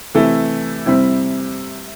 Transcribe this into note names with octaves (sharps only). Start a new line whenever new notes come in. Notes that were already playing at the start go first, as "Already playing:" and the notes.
C3 E3 A3 E4
C3 G3 C4 E4